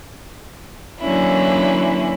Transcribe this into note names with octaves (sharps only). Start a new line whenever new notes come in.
D3 E3 F#3 A#3 C#4 E4